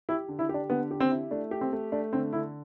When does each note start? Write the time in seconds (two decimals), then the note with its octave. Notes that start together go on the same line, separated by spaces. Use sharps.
0.09 E4 G4
0.28 D3
0.39 E4
0.49 G4
0.54 D4
0.69 D3 B3
0.91 G4
1.00 C4
1.11 E4
1.31 A3 D4
1.51 G4
1.61 C4
1.72 A3
1.92 A3 D4
2.13 D3 C4
2.33 D3 E4